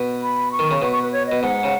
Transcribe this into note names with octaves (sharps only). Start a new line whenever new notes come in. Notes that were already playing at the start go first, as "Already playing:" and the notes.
Already playing: B2
B5
C#6
D#3
C#3
B2 C#6
C#6
B4
C#5
B2 D#5
G#2 F#5
C#3